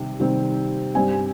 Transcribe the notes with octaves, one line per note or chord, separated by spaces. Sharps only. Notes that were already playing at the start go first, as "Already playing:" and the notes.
Already playing: C3 D#3 G3
C3 D#3 G3 C4
G2 G3 C4 G#5